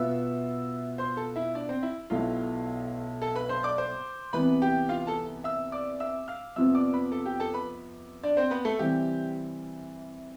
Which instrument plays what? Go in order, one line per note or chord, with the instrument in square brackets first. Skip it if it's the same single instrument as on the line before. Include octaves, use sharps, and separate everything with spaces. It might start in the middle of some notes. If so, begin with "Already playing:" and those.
Already playing: [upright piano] B2 B3 F4 B4 [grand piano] E5 E6
[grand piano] C5 C6
A4 A5
E4 E5
D4 D5
C4 C5
E4 E5
[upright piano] B1 B2 A3 E4 [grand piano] F4 F5
[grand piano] A4 A5
B4 B5
C5 C6
D5 D6
C5 C6
[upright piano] C2 C3 E3 B3 [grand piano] B4 B5
[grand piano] G4 G5
F4 F5
A4 A5
E5 E6
D5 D6
E5 E6
F5 F6
[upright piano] F2 C3 F3 B3 [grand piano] E5 E6
[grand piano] D5 D6
B4 B5
A4 A5
G4 G5
A4 A5
B4 B5
D4 D5
C4 C5
B3 B4
A3 A4
[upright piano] C3 E3 G3 C4 [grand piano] G4